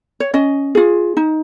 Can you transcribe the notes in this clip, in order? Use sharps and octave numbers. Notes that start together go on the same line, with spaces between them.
C#5
C#4 D#5
F4 G#4
D#4